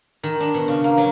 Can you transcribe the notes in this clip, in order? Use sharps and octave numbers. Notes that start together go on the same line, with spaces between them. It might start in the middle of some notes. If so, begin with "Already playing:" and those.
D#3
D4
B2
C#3
A#3
F#3